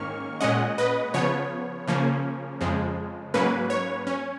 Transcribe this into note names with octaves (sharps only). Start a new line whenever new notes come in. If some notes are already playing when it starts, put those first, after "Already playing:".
Already playing: G#2 D#3 A#3 C#4 C#6 F6
A#2 G#3 C#4 D#5 F#5
B4 D#5
C#3 F3 B3 C#5
C#3 F3 A#3 C#4
F2 C#3 F3 G#3
G#2 F#3 A#3 C#4 B4
C#5
C#4